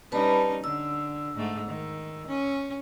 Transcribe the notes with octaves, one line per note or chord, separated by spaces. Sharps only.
G3 C#4 D#4 B4 A5 B5
D3 E6
G#2 A3
D#3
C#4